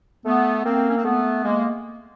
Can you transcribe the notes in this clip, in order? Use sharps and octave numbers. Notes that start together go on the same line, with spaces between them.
A3 B3
A#3 C4
C#4
C4
A3 B3
G#3 A#3